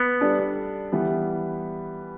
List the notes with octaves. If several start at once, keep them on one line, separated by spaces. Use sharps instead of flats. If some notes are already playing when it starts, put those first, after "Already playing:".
Already playing: B3
G3 D4 A4 D5
E3 G3 B3